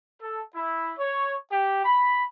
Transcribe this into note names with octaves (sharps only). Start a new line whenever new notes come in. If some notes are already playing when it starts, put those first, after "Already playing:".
A4
E4
C#5
G4
B5